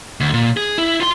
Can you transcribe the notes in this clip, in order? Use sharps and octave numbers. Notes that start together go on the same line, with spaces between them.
D2
A#2
G#4
E4
F4 C6